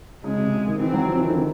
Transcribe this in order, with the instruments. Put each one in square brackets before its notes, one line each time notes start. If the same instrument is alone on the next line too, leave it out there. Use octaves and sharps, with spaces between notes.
[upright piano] C#3 [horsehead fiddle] G#3
[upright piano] C3
C#3
D#3
[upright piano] E3 [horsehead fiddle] C4
[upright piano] F#3
F3
E3
D#3
D3
D#3